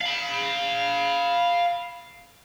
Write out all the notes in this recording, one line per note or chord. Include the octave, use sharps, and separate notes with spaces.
F5 B5